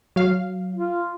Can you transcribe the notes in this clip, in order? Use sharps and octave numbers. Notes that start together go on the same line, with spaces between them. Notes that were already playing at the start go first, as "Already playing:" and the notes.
F#3 F5
F4